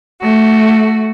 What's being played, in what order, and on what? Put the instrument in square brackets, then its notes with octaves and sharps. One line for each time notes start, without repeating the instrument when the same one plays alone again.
[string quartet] A3 F#4